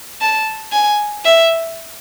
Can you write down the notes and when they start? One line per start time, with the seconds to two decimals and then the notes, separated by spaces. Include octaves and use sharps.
0.21 A5
0.73 G#5
1.25 E5